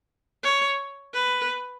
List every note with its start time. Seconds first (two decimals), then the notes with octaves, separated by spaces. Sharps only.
0.43 C#5
1.14 B4